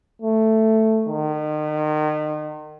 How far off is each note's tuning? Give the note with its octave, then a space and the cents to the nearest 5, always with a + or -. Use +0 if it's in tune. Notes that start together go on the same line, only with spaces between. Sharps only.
A3 +5
D#3 -35